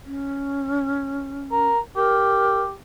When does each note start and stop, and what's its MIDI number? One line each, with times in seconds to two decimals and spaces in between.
0.06 1.69 61
1.51 1.79 70
1.96 2.74 67
1.96 2.61 70